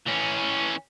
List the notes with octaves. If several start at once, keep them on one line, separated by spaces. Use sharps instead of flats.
E3 C#4